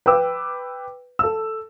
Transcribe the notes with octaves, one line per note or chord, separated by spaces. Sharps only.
B4 G5 D6 E6
A4 E6